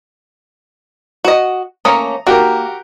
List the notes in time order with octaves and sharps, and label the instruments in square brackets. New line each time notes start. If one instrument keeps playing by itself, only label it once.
[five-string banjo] F#4 D#5
[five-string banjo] A3 A#3 C#4 [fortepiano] A#5 D#6
[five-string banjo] A#3 [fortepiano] F#4 G4 A#4